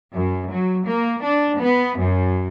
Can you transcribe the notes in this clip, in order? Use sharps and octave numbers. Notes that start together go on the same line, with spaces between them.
F#2
F#3
A#3
D4
B3
F#2